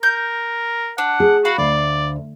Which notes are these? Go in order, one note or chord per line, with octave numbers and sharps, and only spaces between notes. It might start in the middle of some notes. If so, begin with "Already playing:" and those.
A#4 G6
D4 F#5
G#4
F#4 F5 B5
D2 D5